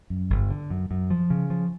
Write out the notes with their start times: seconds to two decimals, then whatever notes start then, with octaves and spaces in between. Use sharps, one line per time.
0.10 F#2
0.30 G1
0.50 D3
0.70 F#2
0.91 F#2
1.10 F3
1.30 C#3
1.50 F3